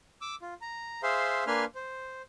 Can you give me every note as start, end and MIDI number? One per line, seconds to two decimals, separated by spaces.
0.21 0.35 86
0.21 0.35 88
0.42 0.54 65
0.61 1.01 82
1.03 1.44 68
1.03 1.44 72
1.03 1.44 76
1.03 1.44 77
1.03 1.44 84
1.47 1.65 58
1.47 1.65 62
1.47 1.65 71
1.47 1.65 80
1.47 1.65 84
1.47 1.65 89
1.75 2.22 72